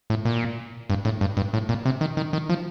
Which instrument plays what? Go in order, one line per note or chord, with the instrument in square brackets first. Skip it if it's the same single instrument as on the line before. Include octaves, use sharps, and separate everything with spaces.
[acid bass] A2
A#2
G2
A2
G2
G2
A2
A#2
C3
D#3
D#3
D#3
F3